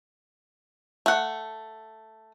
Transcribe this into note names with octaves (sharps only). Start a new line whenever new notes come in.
A3 F#5